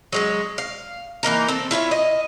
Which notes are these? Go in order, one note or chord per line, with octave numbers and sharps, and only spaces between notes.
F#3 G#3 C#4
F5
E3 A#3 D#4 A#4
C4 A4
E4 F4 C#5 E5
D#5